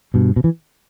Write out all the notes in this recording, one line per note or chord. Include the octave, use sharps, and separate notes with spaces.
G2 B2
B2
E3